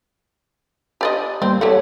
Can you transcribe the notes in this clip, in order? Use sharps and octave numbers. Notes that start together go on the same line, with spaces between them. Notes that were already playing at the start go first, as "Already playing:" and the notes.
G4 D5 D#5
G3 A#3 C4
G4 A4 C#5 E5 F#5